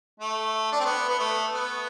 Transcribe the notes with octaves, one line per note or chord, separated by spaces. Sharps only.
A3
D4
C4
B3
B3
A3
B3